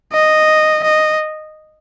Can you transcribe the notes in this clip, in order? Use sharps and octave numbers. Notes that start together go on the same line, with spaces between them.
D#5
D#5